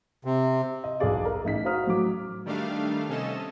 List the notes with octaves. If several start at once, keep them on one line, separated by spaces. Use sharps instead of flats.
C3
D#5
B1 E2 F#4 G#4 D5 F5
A#4
A1 D#4 B6
F#4 C5 F5 A#5 D#6 F6
A2 F#3 D6
D#3 G3 A3 D4 F5
C3 C#4 A4 D#5 E7